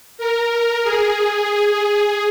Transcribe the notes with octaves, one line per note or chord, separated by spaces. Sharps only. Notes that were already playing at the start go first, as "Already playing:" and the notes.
A#4
G#4